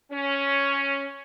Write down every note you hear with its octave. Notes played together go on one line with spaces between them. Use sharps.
C#4